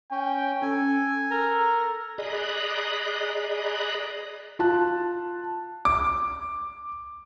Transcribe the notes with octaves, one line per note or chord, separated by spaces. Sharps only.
C#4 G5
C#4 A4 G#5
A4 A#4
G#4 D5 D#5 A#5 B5 F#6
F4 A5 F#6
D6